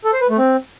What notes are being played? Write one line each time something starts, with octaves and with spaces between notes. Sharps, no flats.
A4
C5
B4
A3
C4